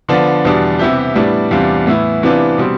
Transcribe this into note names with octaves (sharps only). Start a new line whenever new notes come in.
D3 F3 B3 D4 F4
E2 B2 G3 D4
C3 E3 B3 E4 G4
A2 G3 B3 D4
E2 C3 G3 D4 F4
A2 E3 B3 E4
C3 E3 B3 D4 F4
B2 G3 C4